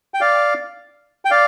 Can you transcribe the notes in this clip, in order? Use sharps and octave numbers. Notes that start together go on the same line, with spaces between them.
G5
D5 F5
G5
D5 F5